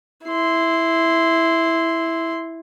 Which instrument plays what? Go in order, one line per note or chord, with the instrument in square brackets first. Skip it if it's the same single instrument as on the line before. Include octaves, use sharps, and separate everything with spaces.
[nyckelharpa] E4 C6